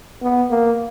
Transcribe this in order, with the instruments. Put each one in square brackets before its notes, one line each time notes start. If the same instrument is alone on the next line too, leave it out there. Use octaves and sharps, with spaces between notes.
[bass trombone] B3
A#3